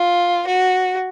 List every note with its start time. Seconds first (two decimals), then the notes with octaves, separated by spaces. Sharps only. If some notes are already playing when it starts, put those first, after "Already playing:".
Already playing: F4
0.48 F#4